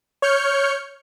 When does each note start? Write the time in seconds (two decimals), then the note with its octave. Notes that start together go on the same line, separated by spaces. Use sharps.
0.22 C#5 F6 G6 C#7